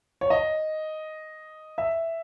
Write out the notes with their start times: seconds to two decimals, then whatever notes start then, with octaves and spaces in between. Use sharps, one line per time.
0.21 C#5
0.30 D#5
1.78 E5